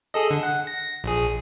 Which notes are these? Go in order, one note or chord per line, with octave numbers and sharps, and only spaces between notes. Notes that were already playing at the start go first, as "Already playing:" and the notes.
G#4 A4 D#5
D3
F#5
A#6
A#1 G#4